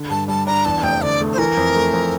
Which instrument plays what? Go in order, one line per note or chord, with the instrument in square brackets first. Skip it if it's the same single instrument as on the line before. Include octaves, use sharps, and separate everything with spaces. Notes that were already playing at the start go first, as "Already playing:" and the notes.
Already playing: [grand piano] D3
[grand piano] G2 [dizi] A5
[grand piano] G3 [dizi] A5
[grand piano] D4 [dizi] A#5
[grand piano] E2 [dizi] A5
[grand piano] F1 [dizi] G5
[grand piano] D3 [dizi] D5
[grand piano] A3
[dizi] C5
[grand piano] E3 [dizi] A#4
[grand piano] F2
A3
F2